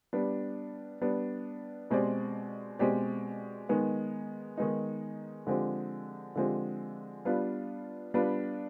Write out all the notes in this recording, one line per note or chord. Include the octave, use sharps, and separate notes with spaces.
G3 B3 D4
G3 B3 D4
B2 G#3 C4 G4 D5
B2 G#3 C4 G4 D5
D#3 G#3 B3 D#4
D#3 G#3 B3 D#4
D3 F3 G#3 C4 G4
D3 F3 G#3 C4 G4
G3 B3 D4 F4 B4
G3 B3 D4 F4 B4